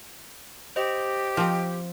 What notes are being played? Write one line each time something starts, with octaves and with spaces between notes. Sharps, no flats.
G4 C5 D#5
F3 C4